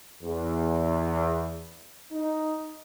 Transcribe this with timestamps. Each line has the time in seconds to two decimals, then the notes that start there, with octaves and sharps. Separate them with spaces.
0.23 E2
2.12 D#4